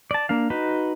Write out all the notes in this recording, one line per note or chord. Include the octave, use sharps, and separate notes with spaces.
D5 A5
A#3 D4 F5
D#4 F#4 B4